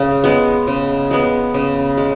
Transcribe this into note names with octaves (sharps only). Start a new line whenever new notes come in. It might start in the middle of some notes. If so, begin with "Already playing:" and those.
Already playing: C#3
G#3 B3
C#3
G#3 B3
C#3
G#3